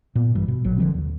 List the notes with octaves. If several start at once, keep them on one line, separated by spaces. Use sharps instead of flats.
A#2 B3
A#1 G2 E3
B2
A#1 F#3
D3 F3 F#3 C4
D#2